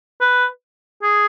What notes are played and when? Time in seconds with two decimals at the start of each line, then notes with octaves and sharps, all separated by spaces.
0.21 B4
1.03 G#4